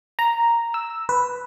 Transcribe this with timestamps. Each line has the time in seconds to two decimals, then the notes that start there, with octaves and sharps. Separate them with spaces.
0.19 A#5
0.74 E6
1.09 B4